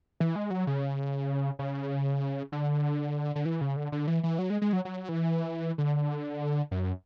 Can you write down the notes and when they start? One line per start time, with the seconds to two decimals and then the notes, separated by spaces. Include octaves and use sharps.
0.20 E3
0.36 G#3
0.50 F#3
0.67 C#3
1.59 C#3
2.52 D3
3.35 D3
3.45 E3
3.61 C#3
3.76 D3
3.92 D3
4.07 E3
4.23 E3
4.39 F#3
4.50 G#3
4.62 G#3
4.73 F#3
4.85 F#3
5.09 E3
5.78 D3
6.71 F#2